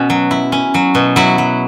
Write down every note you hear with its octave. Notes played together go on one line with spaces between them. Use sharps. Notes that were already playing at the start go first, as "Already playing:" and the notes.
Already playing: B2 C#4 F#4
F#3
E4
C#4
F#3
B2
F#3 E4
F#3